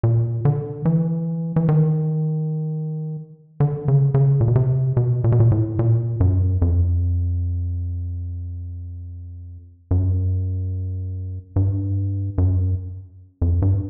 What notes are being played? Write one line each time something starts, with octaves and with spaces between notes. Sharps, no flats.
A#2
D3
E3
E3
D#3
D3
C#3
C#3
A#2
B2
C3
B2
A#2
B2
A#2
A2
A#2
F#2
F2
F#2
G2
F#2
F2
G2